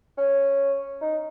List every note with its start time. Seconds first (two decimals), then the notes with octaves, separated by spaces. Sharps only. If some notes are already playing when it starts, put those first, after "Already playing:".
0.18 C#4
1.01 D#4